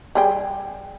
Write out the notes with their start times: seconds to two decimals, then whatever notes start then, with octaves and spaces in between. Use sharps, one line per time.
0.15 G3 G#4 G5